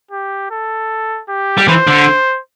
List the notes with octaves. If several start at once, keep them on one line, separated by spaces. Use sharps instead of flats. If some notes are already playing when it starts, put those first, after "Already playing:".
G4
A4
G4
G3
E3 C5
D3